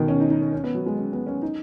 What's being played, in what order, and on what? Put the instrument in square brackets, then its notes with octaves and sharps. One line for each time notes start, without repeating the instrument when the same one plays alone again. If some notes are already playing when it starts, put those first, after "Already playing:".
Already playing: [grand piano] B2 D#3
C#4
D#4
D#4
C#4
C#4
B3
F#3
G#3
C#4
B3
C#4
D#4